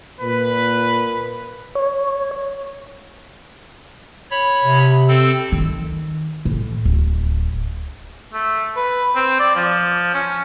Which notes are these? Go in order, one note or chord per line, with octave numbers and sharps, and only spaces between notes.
A#2 B4
C#5
C#5 B5
C3
C4 A4
D#3
A2
D1
A3
B4
C4
D5
F3
C#4